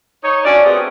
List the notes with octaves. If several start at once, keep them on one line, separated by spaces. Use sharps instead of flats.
D#4 C#5
C#4 D4 F#4 D5
A3 B3 C4 G4 G#4